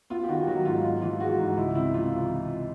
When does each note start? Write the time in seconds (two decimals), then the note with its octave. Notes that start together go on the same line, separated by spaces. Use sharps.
0.10 B3 F4
0.23 G4
0.28 D#3 F#4
0.47 F#3 F#4
0.65 G#2 F4
0.83 G#2 F4
1.02 E3 F4
1.20 G#3 F#4
1.39 G#2
1.57 C#2 E4
1.75 C3 E4
1.94 E3 F4